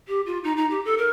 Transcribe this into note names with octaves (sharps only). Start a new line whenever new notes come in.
G4
F4
D#4
D#4
G4
A4
A#4